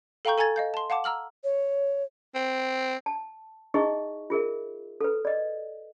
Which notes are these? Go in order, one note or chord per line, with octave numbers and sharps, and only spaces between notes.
A4 F5 G5 A#5 C#6 G6
A4 G#5 A#5 G#6 A6
D#5 F5 G6
A5 C6
F5 F#5 A5 D6
A#5 E6 F6 F#7
C#5
C4
A5
D#4 E4 G#4 D#5 E5 C#6
F4 G#4 A#4 E5
A4 B4
D5 D#5